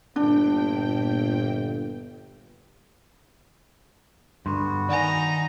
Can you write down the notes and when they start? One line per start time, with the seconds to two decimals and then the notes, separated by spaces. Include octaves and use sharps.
0.16 G1 A#2 D4 G5
4.46 G2 D3 B3 F#4 C6
4.89 D#3 D#4 D5 F#5 G#5 A#5